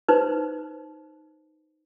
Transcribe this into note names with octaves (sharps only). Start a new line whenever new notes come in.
D#4 B4 C5